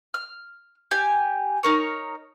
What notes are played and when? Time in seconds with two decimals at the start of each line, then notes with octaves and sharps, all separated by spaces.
0.14 F6
0.91 G4 G#5
1.63 D#4 A#4 C#5